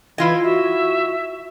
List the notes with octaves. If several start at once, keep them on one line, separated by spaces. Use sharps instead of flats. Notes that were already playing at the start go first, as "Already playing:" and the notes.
E3 E4 F4 D#5 G#6
F#4 E5